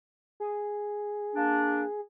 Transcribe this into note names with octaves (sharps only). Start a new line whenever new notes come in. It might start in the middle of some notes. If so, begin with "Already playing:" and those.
G#4
A#3 D4